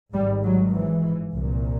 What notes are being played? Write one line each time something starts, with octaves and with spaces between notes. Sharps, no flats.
G#1 G#2 G3
F#3
E3
C2 A#2